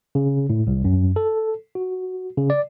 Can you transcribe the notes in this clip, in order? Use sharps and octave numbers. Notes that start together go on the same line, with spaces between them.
C#3
A2
C2
F#2
A4
F#4
C#3
D5